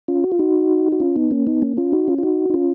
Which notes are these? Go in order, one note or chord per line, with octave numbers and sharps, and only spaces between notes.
C#4 F4
F#4
F4
D#4 F#4
F#4
C#4 F4
B3 D#4
A#3 C#4
B3 D#4
A#3 C#4
C#4 F4
D#4 F#4
C#4 F4
F4
D#4 F#4
D#4
C#4 F4